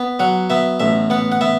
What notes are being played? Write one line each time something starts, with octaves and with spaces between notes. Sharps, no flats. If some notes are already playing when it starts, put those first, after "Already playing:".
Already playing: B3
F#3 F#5
B3 E5
A1 E5
B3 F#5
F#5
B3 E5